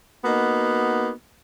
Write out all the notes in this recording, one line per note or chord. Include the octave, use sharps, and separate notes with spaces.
A#3 B3 D#4 F#4